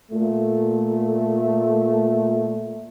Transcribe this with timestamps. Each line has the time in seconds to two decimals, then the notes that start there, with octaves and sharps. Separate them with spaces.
0.12 A#2 A3